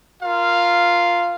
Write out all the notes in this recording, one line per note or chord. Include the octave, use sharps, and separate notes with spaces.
F4 A#4 F5